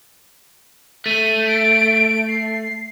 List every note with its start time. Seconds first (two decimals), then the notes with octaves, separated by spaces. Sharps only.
1.06 A3 D#7
1.48 D7
2.28 C7